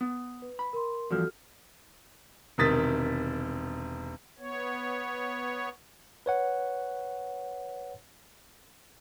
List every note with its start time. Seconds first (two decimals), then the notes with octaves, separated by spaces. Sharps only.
0.01 B3
0.42 B4
0.59 B5
0.73 A#4 C6
1.11 E2 G2 F3 F#4 A4 F6
2.58 E1 C3 D#3 D#6 A6 B6
4.39 B3 C#5
6.26 B4 C#5 F#5